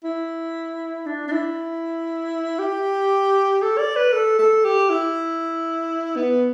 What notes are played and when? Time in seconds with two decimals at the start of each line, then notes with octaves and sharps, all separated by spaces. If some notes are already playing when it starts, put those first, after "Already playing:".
0.04 E4
1.06 D4
1.28 D4
1.32 E4
2.59 G4
3.62 A4
3.78 D5
3.96 B4
4.13 A4
4.39 A4
4.64 G4
4.90 E4
6.16 B3